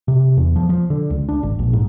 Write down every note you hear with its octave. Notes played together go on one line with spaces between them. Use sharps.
C3
E2
F3
F3
D3
C#2
D4
G#1
A#1
G#2